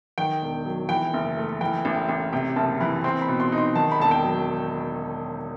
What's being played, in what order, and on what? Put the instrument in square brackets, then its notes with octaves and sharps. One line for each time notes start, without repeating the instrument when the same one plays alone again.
[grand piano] D#3 [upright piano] G5
[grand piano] E1
F#3
[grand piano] E3 [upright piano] G5
[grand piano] F#1
A3
[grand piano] E3 [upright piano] G5
[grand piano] A1
A1
[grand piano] C3 [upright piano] G5
[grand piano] F#1 [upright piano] A5
[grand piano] E3 [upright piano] B5
[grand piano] C4 [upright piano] C6
[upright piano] B5
[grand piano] B2
[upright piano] C6
[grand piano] D#4
[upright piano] C6
[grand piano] D#3 [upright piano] A5
[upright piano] B5
[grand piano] E1 [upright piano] A5
[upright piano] G5
[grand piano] F#3